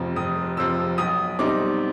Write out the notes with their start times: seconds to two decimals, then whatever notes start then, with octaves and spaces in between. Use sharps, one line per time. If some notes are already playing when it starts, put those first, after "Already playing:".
Already playing: F1 F2 C3 F3
0.16 F1 D#6
0.57 F2 C3 F3 E6
0.98 B1 D#6
1.39 B2 G3 C4 D#4 D6